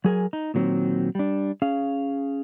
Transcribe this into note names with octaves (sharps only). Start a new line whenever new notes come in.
F#3 G#4 A#4 G#5
D#4
A#2 D#3 F#3 A3 C4
G3 D4
C#4 G#4 F5